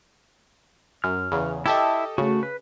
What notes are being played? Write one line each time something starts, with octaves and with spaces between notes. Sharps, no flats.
F#2 F6
E2 C#3
E4 G4 A4 D#5 E5
C#3 A3 F#4
B4